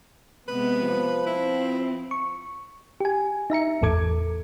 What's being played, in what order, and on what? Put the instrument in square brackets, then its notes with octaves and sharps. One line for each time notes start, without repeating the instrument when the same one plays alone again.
[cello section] C3 G#3 B3 [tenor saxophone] B4
[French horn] F3
[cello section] C4 [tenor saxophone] E4
[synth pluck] C#6
G4 G#5
D#4 E5 A#5 C#7
G#1 E2 A2 A4 D6 G#6